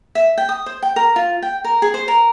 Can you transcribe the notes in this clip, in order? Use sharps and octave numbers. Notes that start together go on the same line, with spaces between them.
E5
G5
D#6
C5
G5
A#4
F4
G5
A#4
G#4
C5
A#4